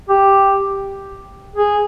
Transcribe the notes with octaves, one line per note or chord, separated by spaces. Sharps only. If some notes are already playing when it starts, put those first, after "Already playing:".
G4
G#4